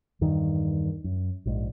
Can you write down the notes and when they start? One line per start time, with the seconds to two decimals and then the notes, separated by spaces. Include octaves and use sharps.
0.21 E2 G2 D#3
1.04 F#2
1.46 A#1 G#2